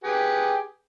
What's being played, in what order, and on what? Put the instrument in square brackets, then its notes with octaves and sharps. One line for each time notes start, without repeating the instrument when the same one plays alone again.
[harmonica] G4 G#4 B4